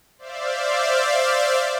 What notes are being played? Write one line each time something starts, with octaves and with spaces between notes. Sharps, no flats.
C5 D5 E5 F5